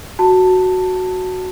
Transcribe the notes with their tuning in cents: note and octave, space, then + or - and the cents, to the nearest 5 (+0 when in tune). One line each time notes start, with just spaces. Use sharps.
F#4 +0 A5 +10